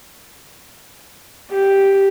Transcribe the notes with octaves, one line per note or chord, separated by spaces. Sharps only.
G4